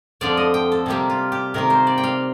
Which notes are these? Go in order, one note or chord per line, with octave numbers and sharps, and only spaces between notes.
F2 D3 F3 D5
D#5
G5
A4
C3 G3 A#3 D4 G4
F4
G4
C3 D#3 A#3 A#4
C5
D5
G5
F5